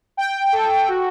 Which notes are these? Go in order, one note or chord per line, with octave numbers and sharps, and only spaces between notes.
G5
A4
F#4